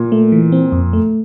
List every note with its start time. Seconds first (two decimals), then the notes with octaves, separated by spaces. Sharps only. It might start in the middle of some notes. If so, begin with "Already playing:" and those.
Already playing: A#2
0.12 A3
0.32 E3
0.52 C4
0.72 F2
0.93 A3